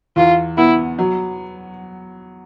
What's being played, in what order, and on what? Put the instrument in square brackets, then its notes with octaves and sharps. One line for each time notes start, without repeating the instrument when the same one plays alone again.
[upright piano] E2 [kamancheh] F4
[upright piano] B3 [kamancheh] E4
[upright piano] F#3